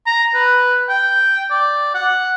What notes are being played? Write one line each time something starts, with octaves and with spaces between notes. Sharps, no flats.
A#5
B4
G5
D5
F#5